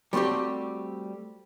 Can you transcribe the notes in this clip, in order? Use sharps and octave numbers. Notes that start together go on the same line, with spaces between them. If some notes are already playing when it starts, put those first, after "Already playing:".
G3 A3 C4 F#4 G4